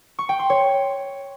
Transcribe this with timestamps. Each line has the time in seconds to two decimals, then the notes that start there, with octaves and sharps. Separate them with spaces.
0.19 C#6
0.29 G5
0.39 C6
0.50 C#5